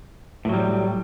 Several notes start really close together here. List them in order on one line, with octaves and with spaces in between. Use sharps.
A2 F#3 G3